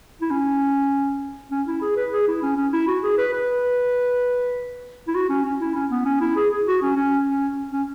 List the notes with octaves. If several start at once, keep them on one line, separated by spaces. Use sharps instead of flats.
E4
C#4
C#4
E4
G#4
B4
G#4
E4
C#4
C#4
E4
F#4
G#4
B4
B4
E4
F#4
C#4
C#4
E4
C#4
B3
C#4
E4
G#4
G#4
F#4
C#4
C#4
C#4
C#4